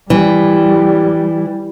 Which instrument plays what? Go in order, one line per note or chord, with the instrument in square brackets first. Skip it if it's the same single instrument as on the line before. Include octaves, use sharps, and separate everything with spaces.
[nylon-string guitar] E3 [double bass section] G3